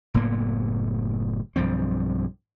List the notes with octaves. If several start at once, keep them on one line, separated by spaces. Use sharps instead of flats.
F#1 A2 A#3 B3
B1 G2 F3 C4